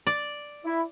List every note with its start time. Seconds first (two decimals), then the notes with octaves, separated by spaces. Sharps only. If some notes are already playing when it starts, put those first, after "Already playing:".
0.07 D5
0.64 E4